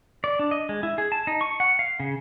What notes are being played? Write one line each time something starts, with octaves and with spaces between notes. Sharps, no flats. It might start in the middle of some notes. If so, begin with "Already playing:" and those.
D5
D4
D#5
G#3
E4
G#4
A5
D#4
C#6
F#5
F5
C#3